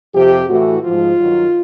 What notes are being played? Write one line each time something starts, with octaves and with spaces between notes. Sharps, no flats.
F2 C3 F3 G4
A2 E3 F#4
G#2 F3 F4
G2 D#3 F#3